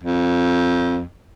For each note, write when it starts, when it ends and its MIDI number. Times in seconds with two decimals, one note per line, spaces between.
0.03 1.02 41